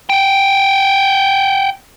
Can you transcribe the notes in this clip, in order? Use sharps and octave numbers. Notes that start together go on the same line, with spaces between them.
F#5 G5